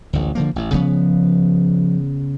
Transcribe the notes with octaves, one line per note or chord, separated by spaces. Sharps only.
A1 D2
D3 F3 A#3
A1
C#3 F3 B3